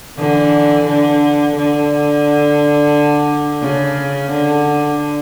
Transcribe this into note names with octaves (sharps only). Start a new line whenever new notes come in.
D3 E3
D3
D3
C#3
D3